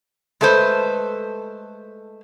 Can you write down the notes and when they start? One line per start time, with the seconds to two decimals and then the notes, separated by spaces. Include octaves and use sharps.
0.41 G#3 A3 A4 B4 C5